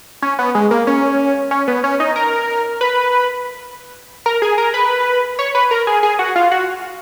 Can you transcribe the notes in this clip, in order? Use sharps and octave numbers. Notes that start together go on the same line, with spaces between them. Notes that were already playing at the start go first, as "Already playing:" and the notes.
C#4
B3
G#3
A#3
C#4
C#4
B3
C#4
D#4
A#4
B4
A#4
G#4
A#4
B4
C#5
B4
A#4
G#4
G#4
F#4
F4
F#4